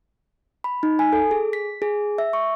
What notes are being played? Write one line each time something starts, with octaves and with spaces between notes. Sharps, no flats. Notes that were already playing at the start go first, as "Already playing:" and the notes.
B5
D#4
G#5
A4
G#4
B6
G#4
E5
C#6